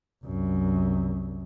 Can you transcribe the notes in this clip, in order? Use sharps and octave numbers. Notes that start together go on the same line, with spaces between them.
C2 F#2